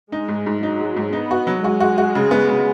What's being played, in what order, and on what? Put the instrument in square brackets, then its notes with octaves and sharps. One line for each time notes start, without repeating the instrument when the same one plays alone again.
[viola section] G#3 [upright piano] D#4
[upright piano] G#2
G#2
[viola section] F#3 [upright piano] D#4
[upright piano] G#3
G#2
[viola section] B3 [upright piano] D#4
[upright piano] F#4
F#3
[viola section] G#3 [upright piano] F#4
[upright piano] F#4
F#4
C#3
B3
C#3